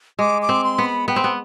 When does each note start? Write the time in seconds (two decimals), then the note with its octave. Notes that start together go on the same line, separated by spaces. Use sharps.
0.19 G#3 D6
0.42 D6
0.49 C4
0.64 C6
0.78 B3
0.86 B5
1.08 B3 G5
1.16 C4
1.24 B3